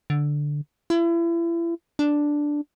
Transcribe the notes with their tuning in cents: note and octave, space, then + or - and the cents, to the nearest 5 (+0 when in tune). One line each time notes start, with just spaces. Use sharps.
D3 +0
E4 +35
D4 +0